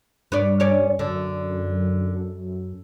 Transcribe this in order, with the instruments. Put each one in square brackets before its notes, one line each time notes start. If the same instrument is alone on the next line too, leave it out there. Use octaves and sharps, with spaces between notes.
[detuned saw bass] G2 [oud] B4 C#5 D5
[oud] C#4 C#5 D5
[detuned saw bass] F#2 [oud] D3